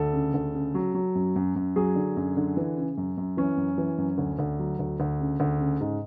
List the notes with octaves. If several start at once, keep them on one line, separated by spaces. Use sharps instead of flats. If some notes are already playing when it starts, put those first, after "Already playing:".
Already playing: D2 A4
C#3
D2
C#3
F#3
F#3
F#2
F#2
F#2
F#3 G#4
D3
F#2
D3
E3
C#3
F#2
F#2
E3 C#4
F#2
E3
F#2
D2
D2
F#3
D2
D2
C#3
D2
C#3
G#2